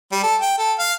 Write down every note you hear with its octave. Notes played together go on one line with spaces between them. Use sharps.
G3
A4
G5
A4
F5